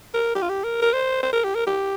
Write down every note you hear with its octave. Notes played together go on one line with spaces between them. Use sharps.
A#4
G4
F4
G4
A#4
A#4
C5
C5
A#4
G4
A#4
G4